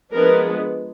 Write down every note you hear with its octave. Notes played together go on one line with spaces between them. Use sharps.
F3 G#3 B3 D4 A#4